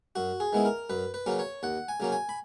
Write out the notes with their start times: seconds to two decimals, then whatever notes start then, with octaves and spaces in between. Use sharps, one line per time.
0.15 F#2 F#4
0.40 G#4
0.53 D#3 G#3 B3 E4
0.65 A#4
0.90 F#2 B4
1.14 B4
1.26 C#3 F#3 A#3 C#4
1.39 C#5
1.63 D#2 F#5
1.88 G#5
2.00 C#3 F#3 A#3 C#4
2.12 G#5
2.29 B5